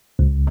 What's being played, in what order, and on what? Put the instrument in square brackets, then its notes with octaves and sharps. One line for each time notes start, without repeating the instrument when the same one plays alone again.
[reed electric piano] C#2